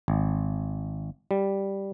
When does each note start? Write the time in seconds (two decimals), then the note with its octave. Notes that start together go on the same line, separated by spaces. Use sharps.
0.08 G#1
1.31 G3